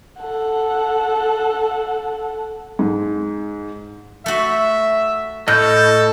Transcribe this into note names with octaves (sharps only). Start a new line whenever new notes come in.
A4 F#5
G#2
A3 F#4 E5
A2 A4 D#5 F6 G6